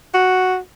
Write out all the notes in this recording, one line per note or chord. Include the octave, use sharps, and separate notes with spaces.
F#4